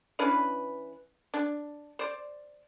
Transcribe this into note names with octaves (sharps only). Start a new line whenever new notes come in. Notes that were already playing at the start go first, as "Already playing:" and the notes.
E3 C#4 D4 B4
D4
C5 D5